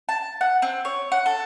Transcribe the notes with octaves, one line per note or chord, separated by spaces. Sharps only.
A5
F#5
C4
C#5
F#5
A4